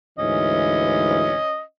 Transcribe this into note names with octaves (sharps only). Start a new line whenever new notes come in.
D2 G#2 E3 C#4 D#5